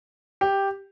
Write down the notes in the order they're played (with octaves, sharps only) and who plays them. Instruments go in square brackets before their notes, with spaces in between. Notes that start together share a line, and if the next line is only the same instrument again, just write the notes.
[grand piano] G4